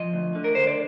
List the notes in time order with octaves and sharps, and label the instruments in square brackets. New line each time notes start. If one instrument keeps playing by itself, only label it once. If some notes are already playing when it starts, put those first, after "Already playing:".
Already playing: [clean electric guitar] F3 D#5
D2
D3
A#4
D2 C5
D5